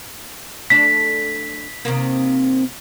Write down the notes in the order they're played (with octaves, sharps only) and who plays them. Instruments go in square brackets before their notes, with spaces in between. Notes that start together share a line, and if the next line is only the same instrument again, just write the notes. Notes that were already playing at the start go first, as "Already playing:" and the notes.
[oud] A3 D4 [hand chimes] B6
[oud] C3 D#3 A#3